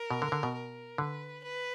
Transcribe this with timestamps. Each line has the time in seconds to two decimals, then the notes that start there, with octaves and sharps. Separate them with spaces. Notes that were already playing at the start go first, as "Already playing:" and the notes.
Already playing: A#4
0.10 B2
0.22 D3
0.32 D3
0.43 B2
0.55 A#4
0.98 D3 B4
1.44 B4